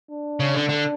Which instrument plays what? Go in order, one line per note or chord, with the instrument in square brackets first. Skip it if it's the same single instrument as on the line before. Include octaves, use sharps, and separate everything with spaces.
[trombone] D4
[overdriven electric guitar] C#3
D3
D3